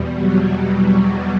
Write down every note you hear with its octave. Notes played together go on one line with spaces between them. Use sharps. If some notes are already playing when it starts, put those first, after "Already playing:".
Already playing: E2 B2 G3
F#3
F#3
G3